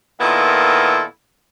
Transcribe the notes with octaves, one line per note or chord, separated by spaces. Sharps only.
A#2 D#3 B3 E4 F4 A4